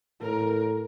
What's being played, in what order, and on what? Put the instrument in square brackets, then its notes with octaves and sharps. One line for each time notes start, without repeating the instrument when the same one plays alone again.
[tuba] A2 [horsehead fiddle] A#4